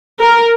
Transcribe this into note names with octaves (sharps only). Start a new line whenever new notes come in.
A#4